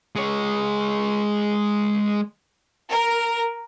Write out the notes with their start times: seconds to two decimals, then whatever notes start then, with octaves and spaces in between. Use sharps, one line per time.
0.16 G#3 C#5
2.90 A#4